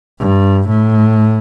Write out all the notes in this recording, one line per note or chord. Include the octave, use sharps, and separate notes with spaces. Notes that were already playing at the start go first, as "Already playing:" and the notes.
G2
A2